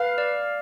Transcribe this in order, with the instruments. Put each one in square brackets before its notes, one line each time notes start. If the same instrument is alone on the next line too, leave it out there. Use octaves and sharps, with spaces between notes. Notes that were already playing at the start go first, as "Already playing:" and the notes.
Already playing: [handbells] B4 [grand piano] F5
[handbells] D5